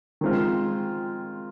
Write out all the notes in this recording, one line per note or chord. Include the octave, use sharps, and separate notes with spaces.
D#3 G#3 C4 F4